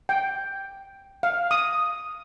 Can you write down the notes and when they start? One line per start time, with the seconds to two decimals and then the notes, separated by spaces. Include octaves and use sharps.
0.09 G5
1.23 F5
1.51 D#6